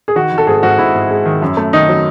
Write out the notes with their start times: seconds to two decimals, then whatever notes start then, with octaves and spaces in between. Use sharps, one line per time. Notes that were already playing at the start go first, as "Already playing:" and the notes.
0.08 G#4
0.15 D#3 F#4
0.32 D#3
0.38 A4
0.47 G#2 G#4
0.63 G#2 F#4
0.79 G#2 E4
0.94 G#2
1.11 G#3
1.26 D#3
1.42 F#2
1.57 A3
1.73 D#3 D#4
1.89 F#3